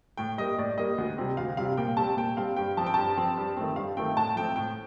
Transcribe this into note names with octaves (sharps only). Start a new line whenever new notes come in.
A2 G5
G3 A#3 D#5
A2 D5
G3 A#3 D#5
D2
C3 G3 C4
D2 F5
C3 G3 C4 F5
A#2 G5
G3 C4 A5
A#2 G5
G3 C4 F5
G2 G5
F3 C4 A5
G5
G2 A5
F3 C4
G2
D#3 A3 C4
G2 F5
D#3 A3 C4 G5
A2 A5
F3 A3 C4 G5
A2 G5